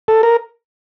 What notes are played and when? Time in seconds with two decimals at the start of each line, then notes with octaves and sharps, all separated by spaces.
0.08 A4
0.23 A#4